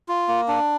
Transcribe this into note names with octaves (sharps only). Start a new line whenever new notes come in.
F4
A#3
D4